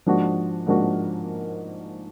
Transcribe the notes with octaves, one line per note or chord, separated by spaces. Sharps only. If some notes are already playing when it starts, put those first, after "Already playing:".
G#2 F3 A#3 D4 F#4
G#2 F3 A#3 D4 F#4